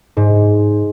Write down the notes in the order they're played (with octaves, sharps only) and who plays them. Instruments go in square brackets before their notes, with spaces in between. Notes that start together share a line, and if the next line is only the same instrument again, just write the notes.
[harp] G#2